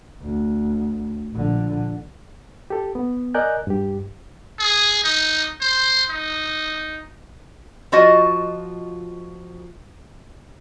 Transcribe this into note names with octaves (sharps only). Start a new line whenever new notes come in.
D2
A#1 D3
G4 A4
B3
A#4 D5 D#5 G#5 F#6 G6
G2 G4
G#4
D#4
C5
D#4
F3 F4 F#4 D#5